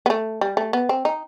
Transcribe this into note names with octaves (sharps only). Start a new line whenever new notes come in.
B3
A3
G3
A3
B3
C4
D#4